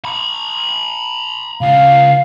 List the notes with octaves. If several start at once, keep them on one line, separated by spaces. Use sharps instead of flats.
A#5 B5
C#3 F4 F5